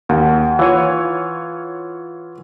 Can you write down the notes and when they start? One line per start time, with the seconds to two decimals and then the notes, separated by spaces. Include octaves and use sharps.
0.09 D#2 F#4
0.59 E3 F4 C#5 F5 G#5